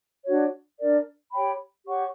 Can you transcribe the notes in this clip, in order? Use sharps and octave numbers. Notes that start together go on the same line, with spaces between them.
D4 F#4 C#5
D4 A#4 D5
G4 C#5 G5 B5
G4 C#5 F#5 C#6